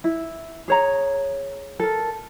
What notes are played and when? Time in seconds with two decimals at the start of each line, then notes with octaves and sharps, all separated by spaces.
0.04 E4
0.68 G#4 C#5 A#5
1.80 A4 A#4